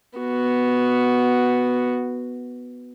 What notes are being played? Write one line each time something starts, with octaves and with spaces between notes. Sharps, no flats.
B3 F#4